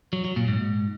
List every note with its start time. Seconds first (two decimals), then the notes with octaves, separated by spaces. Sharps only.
0.13 F#3
0.25 F#3
0.36 A#2
0.48 G#2